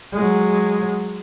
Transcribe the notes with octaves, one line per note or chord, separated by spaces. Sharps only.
F#3 G#3